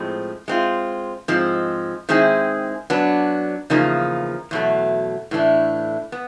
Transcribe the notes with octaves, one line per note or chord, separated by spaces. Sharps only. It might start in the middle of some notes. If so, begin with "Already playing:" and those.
Already playing: A2 F3 G#3 C4
G#3 C4 F4
G#2 F3 G#3 C4
D#3 G#3 C4 E4 G#4
F#3 B3 D4
E2 C#3 F3 A#3 D#4
E2 B2 F#3 A3
A2 E3 A3 D4
B3